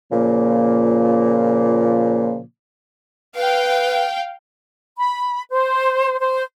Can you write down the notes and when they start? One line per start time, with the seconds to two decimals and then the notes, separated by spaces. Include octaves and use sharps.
0.11 A#2 C#3 F3 A#3
3.35 B4 F5 G5
4.97 B5
5.51 C5
6.20 C5